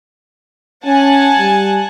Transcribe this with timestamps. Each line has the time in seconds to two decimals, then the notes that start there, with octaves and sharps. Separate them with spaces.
0.85 C#4 F#5 G#5 A5
1.38 G3